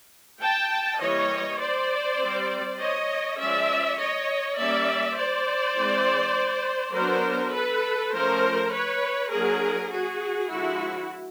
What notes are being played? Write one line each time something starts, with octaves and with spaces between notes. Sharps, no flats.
G5 A5
E3 G3 A#3 C#5 D#5
C5 D5
G3 C4
C#5 D#5
F3 G#3 C#4 D5 E5
C#5 D#5
G3 A#3 C#4 D5 E5
C5 D5
E3 G#3 C4
F#3 B3 D4 A#4 C5
A4 B4
F3 A3 C#4 A#4 C5
B4 C#5
F#3 A#3 D4 G#4 A#4
F#4 G#4
D3 F3 G#3 E4 F#4